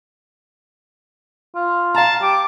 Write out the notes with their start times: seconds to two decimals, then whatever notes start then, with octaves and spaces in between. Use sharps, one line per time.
1.55 F4
1.95 F5 A5 A#5
2.21 G4 D6